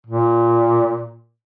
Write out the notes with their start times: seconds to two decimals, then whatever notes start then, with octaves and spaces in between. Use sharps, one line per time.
0.06 A#2